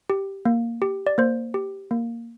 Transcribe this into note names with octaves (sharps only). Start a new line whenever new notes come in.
G4
A#3
G4
D5
A#3 C5
G4
A#3